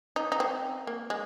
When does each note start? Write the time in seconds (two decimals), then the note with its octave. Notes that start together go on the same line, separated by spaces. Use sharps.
0.16 D#4
0.32 D#4
0.40 C4
0.87 A#3
1.10 G#3